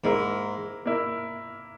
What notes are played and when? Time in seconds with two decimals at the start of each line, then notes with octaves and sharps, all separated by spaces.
0.04 G#2 A#3 E4 A#4
0.85 A#3 E4 A#4